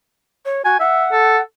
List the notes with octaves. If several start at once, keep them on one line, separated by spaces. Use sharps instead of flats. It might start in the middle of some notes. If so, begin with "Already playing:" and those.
C#5
F#4 G#5
E5 F#5
A4